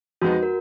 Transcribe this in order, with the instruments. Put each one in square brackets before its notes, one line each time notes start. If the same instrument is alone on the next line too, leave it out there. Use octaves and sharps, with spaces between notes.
[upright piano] F2 F3 G#3 B3 D#4 [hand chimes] F#4
[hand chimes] A#4